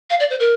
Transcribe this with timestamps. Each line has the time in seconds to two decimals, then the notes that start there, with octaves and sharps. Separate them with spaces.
0.10 F5
0.20 D5
0.30 C5
0.40 A#4